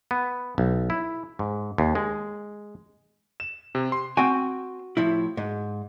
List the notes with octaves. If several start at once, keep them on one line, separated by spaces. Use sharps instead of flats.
B3
B1
E4
G#2
D#2
G#3
E7
C3
C6
C4 F#4 G5 G#5
A2 F3 E4
G#2